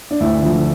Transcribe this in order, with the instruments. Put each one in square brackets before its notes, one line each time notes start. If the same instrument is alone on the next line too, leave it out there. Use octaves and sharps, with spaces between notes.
[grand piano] D4
D2 E4
D3 F3